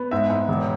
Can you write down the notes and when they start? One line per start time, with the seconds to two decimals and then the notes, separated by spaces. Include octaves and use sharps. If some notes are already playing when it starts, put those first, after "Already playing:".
Already playing: B3
0.11 G#2 E5
0.30 G#2
0.48 E1